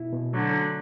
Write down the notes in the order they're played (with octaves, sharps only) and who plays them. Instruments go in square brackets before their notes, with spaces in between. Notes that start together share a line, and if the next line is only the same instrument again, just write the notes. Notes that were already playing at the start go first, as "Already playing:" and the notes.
Already playing: [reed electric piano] B2 E4
B2
[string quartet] D3 F#3 [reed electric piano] A3
[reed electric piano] D4